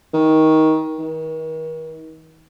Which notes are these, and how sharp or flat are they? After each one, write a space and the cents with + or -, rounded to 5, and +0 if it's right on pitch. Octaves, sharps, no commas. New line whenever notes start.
D#3 +20
D#3 +40